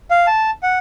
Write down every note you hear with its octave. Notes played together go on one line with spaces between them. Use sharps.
F5
A5
F#5